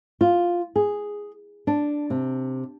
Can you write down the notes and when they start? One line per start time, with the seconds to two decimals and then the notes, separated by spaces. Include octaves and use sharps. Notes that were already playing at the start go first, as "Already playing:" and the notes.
0.21 F4
0.76 G#4
1.67 D4
2.10 C3